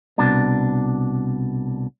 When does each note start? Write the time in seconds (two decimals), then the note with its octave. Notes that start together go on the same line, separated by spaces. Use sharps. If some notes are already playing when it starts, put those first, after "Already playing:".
0.18 C2 B2 D4